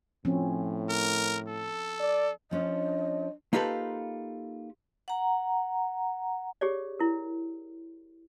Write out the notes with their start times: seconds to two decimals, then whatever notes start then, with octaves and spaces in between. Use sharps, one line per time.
0.25 A2 F3 C4 C#4
0.90 A#4
1.48 A4
2.00 D5
2.51 F3 C#4 D4 D#5
3.53 A#3 D#4 F4 G4 A4 B4
5.08 F#5 A#5
6.61 G4 G#4 C#5 D5
6.99 E4 A#4